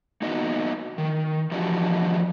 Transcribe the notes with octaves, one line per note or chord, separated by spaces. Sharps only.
A#3 B3 D#4 F#4 D#5
D#3
E3 F3 D4 F#4 G4 D#5